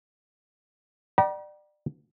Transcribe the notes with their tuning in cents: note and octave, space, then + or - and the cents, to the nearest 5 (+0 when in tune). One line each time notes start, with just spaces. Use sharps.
D5 +30 G5 -40 A#5 +45